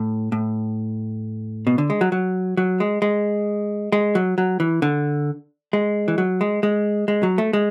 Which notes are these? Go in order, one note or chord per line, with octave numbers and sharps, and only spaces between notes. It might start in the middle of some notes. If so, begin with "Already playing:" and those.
Already playing: A2
A2
B2
D3
G#3
F#3
F#3
F#3
G#3
G#3
G#3
F#3
F#3
E3
D3
G#3
E3
F#3
G#3
G#3
G#3
F#3
A3
G#3